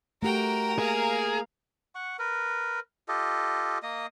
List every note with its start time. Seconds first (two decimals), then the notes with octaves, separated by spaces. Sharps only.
0.23 A3 F#4 G4 A#4 G5 A#5
0.79 A#3 G#4 F5
1.95 F#5 C#6
2.19 A#4 B4
3.08 F4 G4 A4 D#5
3.83 A#3 D#5 D#6